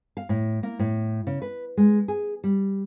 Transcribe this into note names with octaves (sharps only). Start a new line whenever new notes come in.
F5
A2
A#3
A2
C#3
B4
G#3
G#4
G3